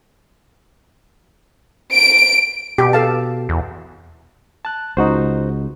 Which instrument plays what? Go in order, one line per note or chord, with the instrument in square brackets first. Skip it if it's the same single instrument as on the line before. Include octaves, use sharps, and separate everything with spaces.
[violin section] D7
[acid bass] B2 [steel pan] G4
[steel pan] A4 F5 A5
[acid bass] E2
[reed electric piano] A5 F#6
[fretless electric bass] C#2 [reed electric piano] D#4 F#4 C5